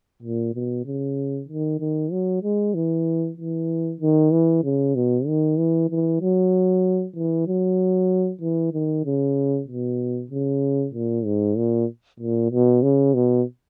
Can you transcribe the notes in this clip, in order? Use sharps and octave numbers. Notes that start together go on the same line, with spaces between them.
A#2
B2
C#3
D#3
D#3
F#3
G#3
E3
E3
D#3
E3
C#3
B2
D#3
E3
E3
F#3
E3
F#3
E3
D#3
C#3
B2
C#3
A#2
G#2
A#2
A#2
B2
C#3
B2